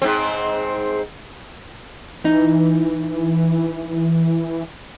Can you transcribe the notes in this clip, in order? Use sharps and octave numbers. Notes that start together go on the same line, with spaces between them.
G#2 C4
E3 D#4